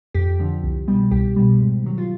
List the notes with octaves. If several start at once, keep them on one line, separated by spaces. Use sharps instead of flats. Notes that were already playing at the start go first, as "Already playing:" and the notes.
F2 G4
D3 F3
C2
B2 G3
C2 G4
B2 G3
G#2
D#3 F#3
F4